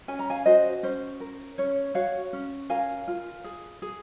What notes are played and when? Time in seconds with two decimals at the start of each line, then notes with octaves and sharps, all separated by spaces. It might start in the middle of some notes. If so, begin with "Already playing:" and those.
0.08 C#4 G#5
0.19 A#5
0.30 F5 G#5
0.46 F#4 C5 D#5
0.83 C#4 C5
1.20 A#4
1.58 C#4 C#5
1.95 F#4 C#5 F5
2.33 C#4
2.70 A#4 F5 G#5
3.08 F4
3.44 G#4
3.82 G#4